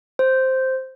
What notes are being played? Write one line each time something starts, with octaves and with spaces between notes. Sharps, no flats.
C5